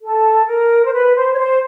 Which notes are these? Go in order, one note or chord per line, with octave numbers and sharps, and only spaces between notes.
A4
A#4
C5
B4
C5
C#5
C5